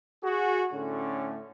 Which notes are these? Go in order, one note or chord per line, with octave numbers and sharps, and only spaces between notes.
F#4 G#4
A2 D3 A3 C#4